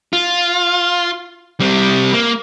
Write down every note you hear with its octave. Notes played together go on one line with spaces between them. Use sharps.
F4
G3 C4
A#3